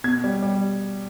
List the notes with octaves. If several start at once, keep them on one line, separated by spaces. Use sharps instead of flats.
B2 G#6
G3
G3